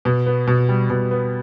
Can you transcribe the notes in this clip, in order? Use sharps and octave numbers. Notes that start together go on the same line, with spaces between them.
B2
B3
B2
G3
B2
B3